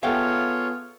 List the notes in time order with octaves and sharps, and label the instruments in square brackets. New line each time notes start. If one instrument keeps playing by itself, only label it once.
[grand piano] B3 G#4 A4 [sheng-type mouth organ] F4 C#5 [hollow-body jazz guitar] E5 F5 G5